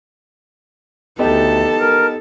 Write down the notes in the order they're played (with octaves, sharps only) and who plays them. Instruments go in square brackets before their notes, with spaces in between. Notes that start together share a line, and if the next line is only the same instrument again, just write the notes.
[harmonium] D2 [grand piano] B3 D#4 G4 [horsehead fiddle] A4 A5
[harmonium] A#4